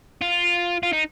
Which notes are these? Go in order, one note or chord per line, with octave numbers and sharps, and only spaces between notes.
F4
F4
D#4